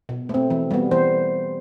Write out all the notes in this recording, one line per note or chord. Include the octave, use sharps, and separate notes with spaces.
B2
A3 C4
E3
G3 B3
E3 C5